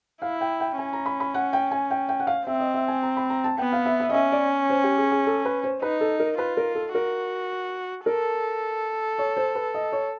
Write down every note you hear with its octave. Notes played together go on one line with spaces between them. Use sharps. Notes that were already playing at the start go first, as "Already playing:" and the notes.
E4 F5
G5
G5
C#4 G#5
A#5
B5
B5
F#5
G5
G#5
G5
G5
F#5
F5
C4 E5
D#5
E5
G#5
A#5
B5
A#5
A5
B3 G5
F5
E5
E5
D#5
C#4 E5
D5
C5
G4
G#4
G#4
A4
B4
C5
D#4 B4
A4
A#4
F4 B4
A#4
A4
F#4 A#4
A4 A#4
C#5
C5
B4
D#5
C#5